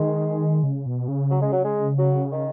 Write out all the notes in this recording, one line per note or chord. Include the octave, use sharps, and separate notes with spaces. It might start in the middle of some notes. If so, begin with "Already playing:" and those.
Already playing: D#3 G#3
C#3
B2
C#3
F#3
G#3
F#3
G#3
F#3
D#3